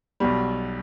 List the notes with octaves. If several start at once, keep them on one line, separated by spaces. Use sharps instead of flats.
B1 B2 G3